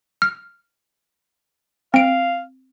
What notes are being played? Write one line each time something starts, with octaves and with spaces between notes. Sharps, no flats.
F6
C4 F5 D7